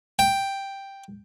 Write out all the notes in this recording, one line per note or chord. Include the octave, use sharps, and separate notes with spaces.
G5